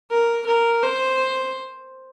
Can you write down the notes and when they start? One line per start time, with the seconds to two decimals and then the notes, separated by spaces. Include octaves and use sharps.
0.10 A#4
0.46 A#4
0.83 C5